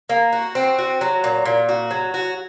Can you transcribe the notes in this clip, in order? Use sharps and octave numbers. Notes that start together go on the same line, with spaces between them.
A#3
F#4
C4
F#4
F#3
A#2
A#2
F#4
F#3
F#4